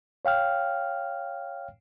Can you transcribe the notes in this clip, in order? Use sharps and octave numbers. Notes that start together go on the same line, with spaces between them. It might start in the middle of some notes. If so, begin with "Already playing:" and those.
C#5 F5 G5 F6